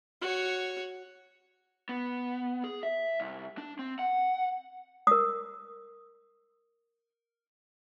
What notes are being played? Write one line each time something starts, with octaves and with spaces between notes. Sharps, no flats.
F#4 C#5
B3
G#4
E5
C2
D4
C4
F#5
A#4 D#6